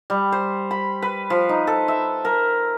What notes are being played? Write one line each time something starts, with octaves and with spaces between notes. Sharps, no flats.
G3
C5
B5
B4
F3
D#4
A4
E5
A#4